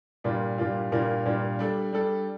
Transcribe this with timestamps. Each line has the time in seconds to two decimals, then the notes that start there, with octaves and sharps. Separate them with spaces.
0.24 A#2 G3 A#3 D4 F4
0.58 A#2 G3 A#3 D4 F4
0.92 A#2 G3 A#3 D4 F4
1.25 A#2 G3 A#3 D4 F4
1.59 G3 D4 A4
1.92 G3 D4 A4